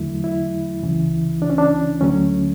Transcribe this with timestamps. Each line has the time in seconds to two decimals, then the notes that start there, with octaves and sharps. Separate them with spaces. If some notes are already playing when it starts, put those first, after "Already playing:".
Already playing: E2 D3 F#3 A3 E4
0.24 E4
0.83 C#2 C#3 E3
1.42 D4
1.50 C#4
1.58 D4
2.01 D2 D3 F#3 A3 C#4